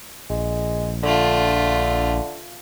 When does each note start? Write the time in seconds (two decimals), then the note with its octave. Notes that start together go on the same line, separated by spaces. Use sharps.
0.30 A#1 G#3
1.03 D3 A3 F4